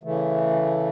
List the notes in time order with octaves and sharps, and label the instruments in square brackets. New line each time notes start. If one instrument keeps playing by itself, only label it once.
[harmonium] C#3 E3 A3